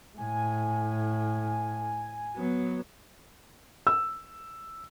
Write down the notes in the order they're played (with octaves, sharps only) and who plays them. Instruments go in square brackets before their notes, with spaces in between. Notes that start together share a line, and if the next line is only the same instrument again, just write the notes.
[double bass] A2 [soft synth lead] G#5
[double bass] F#3 B3
[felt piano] E6